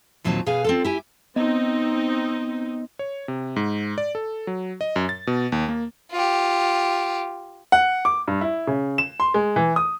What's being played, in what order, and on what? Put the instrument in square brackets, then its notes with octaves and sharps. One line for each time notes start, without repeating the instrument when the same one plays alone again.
[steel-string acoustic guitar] D#2 A#2 F#3 C4 D#4 A5
B2 G#4 B4 F5 G#5
C4 F4 A4
E4 G4 G#5
[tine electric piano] B3 D#5 [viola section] C4 D#4
[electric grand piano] C#5
C3
G#2
D5
A4
F#3
D#5
F#2
A6
B2
D#2
A#3
[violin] F4 G4
[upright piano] F#5
D6
G2
E4
C#3
E7
C6
G#3
E3
D#6